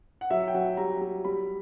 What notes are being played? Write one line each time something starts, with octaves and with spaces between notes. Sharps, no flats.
F#5
F#3 E5
G5
F#3 F#5
G3 A#5
G3
G3 B5